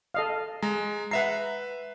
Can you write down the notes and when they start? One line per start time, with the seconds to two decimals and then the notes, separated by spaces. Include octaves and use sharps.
0.14 A4 D#5 F5
0.63 G#3 A#5
1.11 B4 E5 F#5 A#5 C7